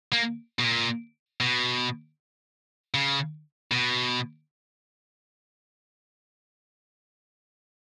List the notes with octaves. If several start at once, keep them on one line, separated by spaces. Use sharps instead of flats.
A#3
B2
A#2
B2
C#3
B2